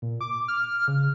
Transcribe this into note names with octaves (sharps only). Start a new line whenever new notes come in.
A#2
D6
F6
C#3